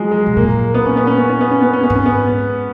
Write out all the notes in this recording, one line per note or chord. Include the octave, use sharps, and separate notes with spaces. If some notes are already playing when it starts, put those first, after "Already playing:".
Already playing: F3 F#3 G#3
G#3
B2
A#2 A#3
B3
C#4
B3
C#4
B3
C#4
B3
C#4
B3
C#4
B3
G#2
C#4
B3